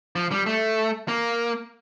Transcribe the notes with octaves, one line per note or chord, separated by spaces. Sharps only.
F3
G3
A3
A#3